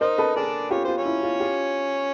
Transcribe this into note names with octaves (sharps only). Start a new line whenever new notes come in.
D#4 A#4 C5 D#5
A4 B4
D4 G#4 A#4 D5
F4 G4 C#5
F4 C5
C#4 C#5
E4
F4
F4 G4